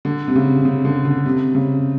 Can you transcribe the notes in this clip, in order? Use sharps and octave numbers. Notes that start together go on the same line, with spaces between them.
D3
C3
C#3
C#3
D3
D3
C3
C#3